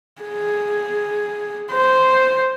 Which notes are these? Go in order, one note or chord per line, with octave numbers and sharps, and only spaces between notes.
G#4
C5